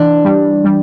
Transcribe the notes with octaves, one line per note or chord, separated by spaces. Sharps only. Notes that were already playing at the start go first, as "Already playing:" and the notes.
Already playing: E3 D4
G3
G3